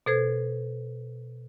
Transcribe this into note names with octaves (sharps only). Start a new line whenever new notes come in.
B2 A4 C5 G#6